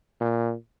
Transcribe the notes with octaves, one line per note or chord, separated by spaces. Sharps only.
A#2